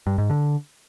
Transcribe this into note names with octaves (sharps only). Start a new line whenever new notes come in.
G2
G#2
D3